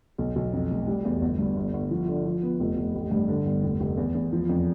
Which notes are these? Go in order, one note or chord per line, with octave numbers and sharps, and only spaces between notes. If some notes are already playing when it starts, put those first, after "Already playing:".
B1
B1
F2
F1
G3
E2
G1
G2
G1
G1
F3
D3
F3
B3
F1
F1
A1
G2
D3
G1
F1
F1
E2
E2
F3
F2